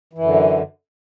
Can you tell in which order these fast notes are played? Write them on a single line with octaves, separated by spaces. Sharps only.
E3 F#2 D3